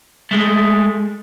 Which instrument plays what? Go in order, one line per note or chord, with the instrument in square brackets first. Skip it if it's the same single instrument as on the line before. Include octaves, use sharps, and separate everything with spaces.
[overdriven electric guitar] G#3 A3